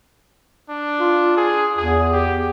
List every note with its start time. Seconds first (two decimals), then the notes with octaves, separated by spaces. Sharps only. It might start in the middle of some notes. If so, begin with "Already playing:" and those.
0.70 D4
1.00 F4
1.37 G#4
1.78 E2 G#4
2.12 G4